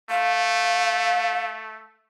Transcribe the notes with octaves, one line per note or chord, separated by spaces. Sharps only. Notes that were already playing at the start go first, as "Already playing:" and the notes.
A3 F5